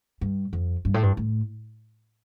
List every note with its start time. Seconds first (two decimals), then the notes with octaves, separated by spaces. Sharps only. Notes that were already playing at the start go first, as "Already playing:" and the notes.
0.21 G2
0.53 F2
0.85 G2
0.94 A2
1.03 G2
1.17 A2